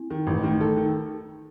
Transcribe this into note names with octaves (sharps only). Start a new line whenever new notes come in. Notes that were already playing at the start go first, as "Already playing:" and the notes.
Already playing: C4 E4
D#3
A1
D#3 A3
A4
D#3